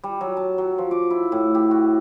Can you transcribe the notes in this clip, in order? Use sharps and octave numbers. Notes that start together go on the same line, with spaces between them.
G3
F#3
A5
F#3
F3
D6
E4
A2
G4
F#4